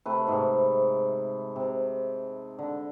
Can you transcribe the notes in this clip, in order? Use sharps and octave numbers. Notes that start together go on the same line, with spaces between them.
C3 A3 B4
G#2 C3
C3
D3